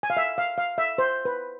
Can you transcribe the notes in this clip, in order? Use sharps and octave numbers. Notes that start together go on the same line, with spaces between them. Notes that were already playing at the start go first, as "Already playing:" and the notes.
G#5
F5
E5
F5
F5
E5
C5
B4